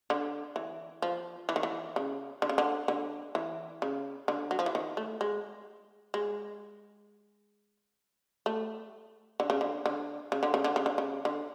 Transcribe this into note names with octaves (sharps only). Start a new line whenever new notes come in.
D3
E3
F3
E3
D#3
E3
C#3
D3
C#3
D3
D3
E3
C#3
D3
F#3
F3
E3
D#3
A3
G#3
G#3
A3
D3
C#3
D3
D3
C#3
D3
C#3
D3
C#3
D3
C#3
D3